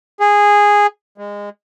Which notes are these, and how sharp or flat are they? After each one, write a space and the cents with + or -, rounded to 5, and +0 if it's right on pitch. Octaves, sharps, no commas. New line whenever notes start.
G#4 -10
G#3 -25